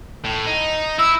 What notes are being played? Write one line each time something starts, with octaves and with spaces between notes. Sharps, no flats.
A2
D#4
E4 E6